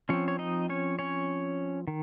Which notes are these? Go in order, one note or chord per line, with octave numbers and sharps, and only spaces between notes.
F3 C4 C#4 C#5
C#5
D#4 D#5
C#4 C#5
C#4 C#5
D#3